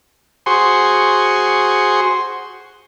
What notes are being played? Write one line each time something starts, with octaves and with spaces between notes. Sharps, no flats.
F#4 G#4 C5 C6 C#6